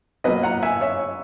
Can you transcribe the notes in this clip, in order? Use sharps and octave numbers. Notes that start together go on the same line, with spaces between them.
B2 F#3 A#3 B4 D#5
F#5 A#5
E5 G#5
C#5 E5